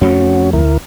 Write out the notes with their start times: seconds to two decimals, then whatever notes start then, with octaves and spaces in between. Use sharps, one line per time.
0.01 F2 A3 C#4 F#4
0.53 D2 E4 A#4